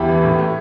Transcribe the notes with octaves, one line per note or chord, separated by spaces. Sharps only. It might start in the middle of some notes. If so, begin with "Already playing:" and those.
Already playing: E2 E4 G4
E3
A2
A3